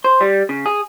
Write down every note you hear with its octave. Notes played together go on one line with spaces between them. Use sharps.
C5
G3
C#3
G#4